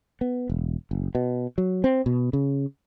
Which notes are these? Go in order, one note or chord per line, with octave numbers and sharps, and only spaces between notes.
B3
E1
F#1
B2
F#3
C4
B2
C#3